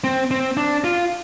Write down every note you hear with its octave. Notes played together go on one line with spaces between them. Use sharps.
C4
C4
D4
F4